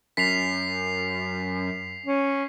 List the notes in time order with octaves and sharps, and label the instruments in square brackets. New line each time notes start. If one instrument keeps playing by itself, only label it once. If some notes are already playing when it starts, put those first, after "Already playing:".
[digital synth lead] F#2 [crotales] B6 C7 F7
[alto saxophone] C#4